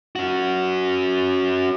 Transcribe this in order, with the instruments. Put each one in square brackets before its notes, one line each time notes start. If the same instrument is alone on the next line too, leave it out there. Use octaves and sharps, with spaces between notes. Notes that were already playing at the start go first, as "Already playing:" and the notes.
[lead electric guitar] C#4 F#4